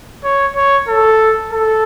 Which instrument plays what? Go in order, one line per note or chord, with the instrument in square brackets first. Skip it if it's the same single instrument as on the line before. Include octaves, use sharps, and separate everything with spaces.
[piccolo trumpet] C#5
C#5
A4
A4